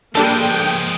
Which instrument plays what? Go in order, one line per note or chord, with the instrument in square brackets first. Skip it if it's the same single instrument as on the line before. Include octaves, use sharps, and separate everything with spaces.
[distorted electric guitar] F3 G#3 [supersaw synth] G3 D4 A4 [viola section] A#3 G5